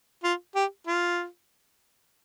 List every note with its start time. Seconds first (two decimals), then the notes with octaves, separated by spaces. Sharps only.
0.24 F4
0.55 G4
0.87 F4